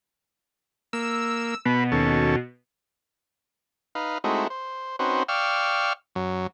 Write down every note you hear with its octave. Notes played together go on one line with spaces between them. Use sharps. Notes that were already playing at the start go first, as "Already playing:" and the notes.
A#3 E6
B2 B4
D#2 C#4 A4
D#4 B4 F5
G#3 A3 C4 D#4 E4 F#4
C5
C4 C#4 D#4 F#4 B4 C5
D5 F5 G5 C#6 E6 F6
F#2 F#3